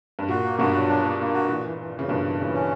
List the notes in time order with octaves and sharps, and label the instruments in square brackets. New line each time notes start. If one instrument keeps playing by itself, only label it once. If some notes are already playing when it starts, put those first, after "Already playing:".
[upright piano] G2
[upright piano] A#2 [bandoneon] F#4
[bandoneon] A#3
[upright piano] G2 B2 [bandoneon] F#4
[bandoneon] F#3
D4
A#3
A#3
F#4
[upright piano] A#2 [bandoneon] E3
[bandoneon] E3
E3
[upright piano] C#3 [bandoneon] E3
[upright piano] G2 B2 [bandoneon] E3
[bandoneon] E3
[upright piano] A#2 C#3 [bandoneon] E3
[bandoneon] C#4